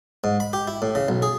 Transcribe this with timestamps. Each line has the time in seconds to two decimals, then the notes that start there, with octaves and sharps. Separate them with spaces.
0.24 G#2
0.40 B5
0.53 G4
0.67 E4
0.82 A2
0.95 C#3
1.08 B1
1.22 G#4